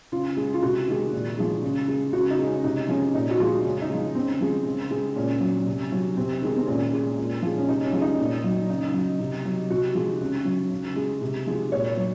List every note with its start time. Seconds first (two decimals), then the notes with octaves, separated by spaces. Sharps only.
0.12 C#3 F4
0.37 G#3
0.54 F4
0.62 C3 F#4
0.87 D#3 G#3
1.12 A#2
1.38 F3 G#3
1.63 C#3
1.88 G#3
2.13 C#3 F#4
2.31 D#4
2.39 G#3
2.46 C#4
2.64 C3 D#4
2.88 F3 G#3 C#4
3.14 A#2 D#4
3.31 F#4
3.39 F3 G#3 F4
3.64 C#3 C#4
3.82 D#4
3.90 F3 G#3
3.98 C#4
4.15 C#3 C4
4.41 F3 G#3
4.66 C#3
4.91 G#3
5.16 A#2 C#4
5.41 F#3
5.66 C3
5.92 F#3
6.17 C3 C4
6.42 D#3 G#3
6.56 C4
6.67 A#2 C#4
6.93 G#3
7.18 A#2
7.42 F3 G#3
7.58 C#4
7.68 C3 D#4
7.85 C#4
7.93 F3 G#3
8.01 D#4
8.18 A#2
8.44 F#3
8.69 C#3 D#4
8.94 F#3
9.20 C3
9.45 F#3
9.70 C3 F#4
9.95 F3 G#3
10.21 C#3
10.45 F#3
10.70 C#3
10.96 G#3
11.21 C3
11.47 F3 G#3
11.72 A#2 C#5
11.97 F#3